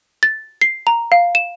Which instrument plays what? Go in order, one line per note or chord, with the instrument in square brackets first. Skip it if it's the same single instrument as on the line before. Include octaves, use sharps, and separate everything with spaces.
[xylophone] A6
C7
A#5
F5
E7